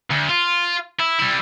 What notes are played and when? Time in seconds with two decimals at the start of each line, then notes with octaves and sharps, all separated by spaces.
0.10 D2
0.29 F4
0.99 E4
1.20 G3 E4